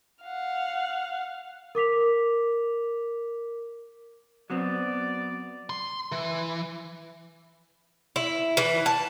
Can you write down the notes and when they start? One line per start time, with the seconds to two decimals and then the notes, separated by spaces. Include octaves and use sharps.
0.24 F5 F#5
1.75 A#4 D6 B6 F7
4.50 F#3 B3 C4 D5
5.70 C6
6.12 E3
8.16 E4
8.57 E3
8.86 A5